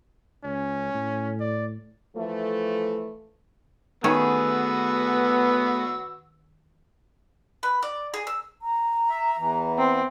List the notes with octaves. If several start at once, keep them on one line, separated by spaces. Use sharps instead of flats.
C#2 C#4
A2
D5
E3 F3 A3
D#3 A3 B3 C#4 F#4 G#4 B4 E6
B4
D5
G#4
E6
A#5
E5
E2 E3
C4